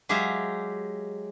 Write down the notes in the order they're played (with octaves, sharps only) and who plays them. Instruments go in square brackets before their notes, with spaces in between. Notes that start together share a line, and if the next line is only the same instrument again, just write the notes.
[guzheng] F#3 G#3 G4 G#4 E5 F5